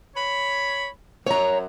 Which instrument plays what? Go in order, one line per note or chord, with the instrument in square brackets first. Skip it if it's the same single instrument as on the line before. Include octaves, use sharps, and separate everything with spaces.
[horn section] C#5 B5
[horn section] F#2 [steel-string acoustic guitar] C#5 A#5